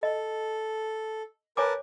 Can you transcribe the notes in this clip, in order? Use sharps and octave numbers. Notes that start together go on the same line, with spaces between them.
A4 D#5
A#4 B4 C#5 G#5 A5 D6